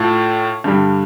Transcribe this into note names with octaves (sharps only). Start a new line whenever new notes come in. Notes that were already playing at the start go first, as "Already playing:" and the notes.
Already playing: A2 A3 F4
G2 D3 G3